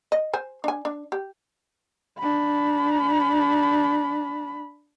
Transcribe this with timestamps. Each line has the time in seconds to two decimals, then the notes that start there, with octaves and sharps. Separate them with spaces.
0.12 D#5
0.33 C5 G#5
0.64 D4 G#5
0.85 D4
1.12 G4
2.19 D4 B5